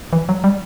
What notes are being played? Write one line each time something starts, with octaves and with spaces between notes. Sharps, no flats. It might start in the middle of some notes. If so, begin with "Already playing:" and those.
E3
F#3
G3